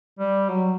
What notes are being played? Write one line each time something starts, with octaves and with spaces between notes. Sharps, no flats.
G3
F#3